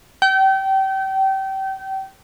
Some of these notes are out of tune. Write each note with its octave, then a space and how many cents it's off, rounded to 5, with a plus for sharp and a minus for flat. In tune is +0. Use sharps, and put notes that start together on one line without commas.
G5 -30